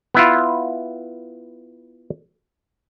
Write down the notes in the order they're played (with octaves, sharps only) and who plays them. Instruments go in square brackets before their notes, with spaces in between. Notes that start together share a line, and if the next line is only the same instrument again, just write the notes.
[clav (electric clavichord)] B3 E4 F4